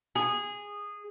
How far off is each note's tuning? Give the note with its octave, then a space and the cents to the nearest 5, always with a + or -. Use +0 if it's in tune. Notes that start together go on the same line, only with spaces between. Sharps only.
G#4 -15